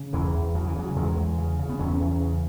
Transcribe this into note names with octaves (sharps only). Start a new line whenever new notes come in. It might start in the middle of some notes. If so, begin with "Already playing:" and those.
Already playing: C#3
E2 E3
E2
C#3 F#3
E3
C#3 F#3
E2 G#3
E2
C#3
C#3
B3
E2 C#4
E2
C#3